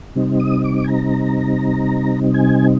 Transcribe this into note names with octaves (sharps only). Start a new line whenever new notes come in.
C3 G3 C4 D#4
D#6
D6
G#5
A#5
G#5